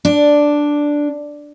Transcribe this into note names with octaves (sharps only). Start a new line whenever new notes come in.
D4